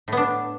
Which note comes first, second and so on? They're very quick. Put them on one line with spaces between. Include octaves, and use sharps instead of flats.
A2 B3 D4